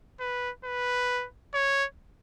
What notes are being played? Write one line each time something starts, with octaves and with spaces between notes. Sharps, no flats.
B4
B4
C#5